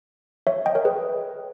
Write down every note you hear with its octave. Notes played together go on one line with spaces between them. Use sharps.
C#5 E5
D#5 G5
A#4 C#5
G#4 B4